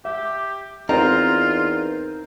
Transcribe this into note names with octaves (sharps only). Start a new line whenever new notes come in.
G4 E5
E2 C4 D#4 F4 A#4 C5 A#5